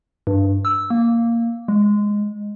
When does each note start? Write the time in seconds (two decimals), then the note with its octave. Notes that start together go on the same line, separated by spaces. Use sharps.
0.27 G2
0.65 E6
0.90 A#3
1.68 G#3